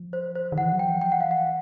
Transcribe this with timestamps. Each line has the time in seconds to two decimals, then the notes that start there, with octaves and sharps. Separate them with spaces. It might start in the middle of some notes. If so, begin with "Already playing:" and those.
Already playing: F3
0.13 C5
0.35 C5
0.52 D#3
0.57 E3 F#5
0.72 F#3
0.79 G5
0.86 F3
1.01 E3 G5
1.12 F#5
1.21 F5
1.31 F#5